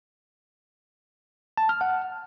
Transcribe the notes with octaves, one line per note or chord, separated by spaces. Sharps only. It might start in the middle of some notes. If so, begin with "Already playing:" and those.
A5
F6
F#5